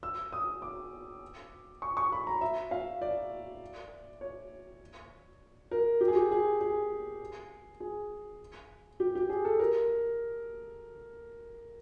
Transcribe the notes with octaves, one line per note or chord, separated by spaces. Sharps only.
E6
D#6
D6
C#6
C#6
B5
A#5
E5
F5
D5
C#5
A#4
G4
G#4
G4
G#4
G#4
G#4
G4
G4
G#4
A4
A#4